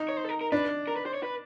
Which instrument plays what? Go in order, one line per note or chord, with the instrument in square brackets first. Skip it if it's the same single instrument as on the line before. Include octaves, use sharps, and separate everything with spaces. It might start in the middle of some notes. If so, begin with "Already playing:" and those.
Already playing: [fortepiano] D#4
[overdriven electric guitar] C#5
C5
A4
A#4
A#4
[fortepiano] D4 [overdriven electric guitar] B4
[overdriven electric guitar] A#4
B4
C5
C#5
B4